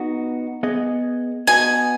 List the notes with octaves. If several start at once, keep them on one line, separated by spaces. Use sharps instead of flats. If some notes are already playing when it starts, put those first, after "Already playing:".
Already playing: B3 D#4 F#4
B3 G#4 D#5
B3 F#4 D#5 G#5